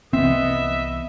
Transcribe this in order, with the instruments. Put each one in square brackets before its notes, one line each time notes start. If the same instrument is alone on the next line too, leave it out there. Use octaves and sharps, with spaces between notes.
[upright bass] C2 E3 [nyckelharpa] B3 D#5 [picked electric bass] C4 [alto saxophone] E5